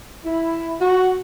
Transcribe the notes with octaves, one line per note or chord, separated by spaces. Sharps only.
E4
F#4